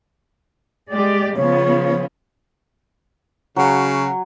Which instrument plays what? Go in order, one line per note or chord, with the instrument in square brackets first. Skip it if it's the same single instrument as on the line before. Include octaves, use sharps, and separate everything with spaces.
[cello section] G#3 G4 D5
[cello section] C#3 F3 B3 [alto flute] C#5
[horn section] C#3 F#4 [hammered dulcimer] F#3